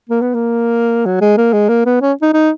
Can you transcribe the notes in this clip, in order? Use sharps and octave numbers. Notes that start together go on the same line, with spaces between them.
A#3
B3
A#3
F#3
G#3
A#3
G#3
A#3
B3
C#4
D#4
D#4